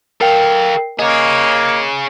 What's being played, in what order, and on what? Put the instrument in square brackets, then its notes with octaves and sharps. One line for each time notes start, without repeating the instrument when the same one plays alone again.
[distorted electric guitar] A4 F5 [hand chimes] A#4 G5
[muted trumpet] A#3 [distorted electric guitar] G#4 C#5 [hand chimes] D#5